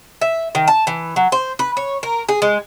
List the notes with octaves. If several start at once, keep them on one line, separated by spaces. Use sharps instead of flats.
E5
D#3
A5
E3
F#3
C5
B4
C#5
A#4
G#4
G#3